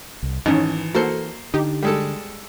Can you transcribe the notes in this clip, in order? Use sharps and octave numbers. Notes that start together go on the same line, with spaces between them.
C2
G#1 E3 C#4 D#4
A#3 F#4 A4 C5 C#7
D3 D#4 G4
G3 G#3 A4